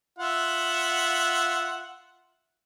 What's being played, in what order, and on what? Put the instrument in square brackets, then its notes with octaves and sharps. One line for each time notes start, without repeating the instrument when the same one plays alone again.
[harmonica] F4 E5 F#5